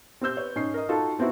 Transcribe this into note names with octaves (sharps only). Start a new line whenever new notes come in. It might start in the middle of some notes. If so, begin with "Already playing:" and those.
C4 G4 C5 E6 G6
B4 C#5
G#2 C#4 D#5 C7
A#4 D#5
D#4 F4 F#4 A4
B3 C4 D#4 E4 F#4